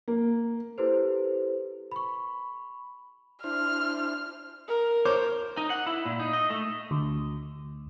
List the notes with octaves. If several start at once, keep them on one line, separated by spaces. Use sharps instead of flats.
A#3
E4 G4 A4 B4 C5
B5 C#6
D4 E4 C5 F6
A#4
C5 C#5 D6
D#4
F#5
E4
A#2
D#4
D#5
A3
D2